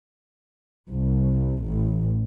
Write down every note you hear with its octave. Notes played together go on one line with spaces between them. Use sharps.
C2
A1